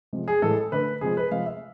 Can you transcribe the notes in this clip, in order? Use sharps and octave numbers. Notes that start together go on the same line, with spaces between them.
C3 F3 G#3
G#4
A2 E3 G#3 A4
D3 A3 B4
C3 F3 G#3 G#4
B4
C3 F3 G#3 F5
E5